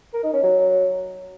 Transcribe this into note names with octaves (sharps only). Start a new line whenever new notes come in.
A#4
D#4
C#4
F#3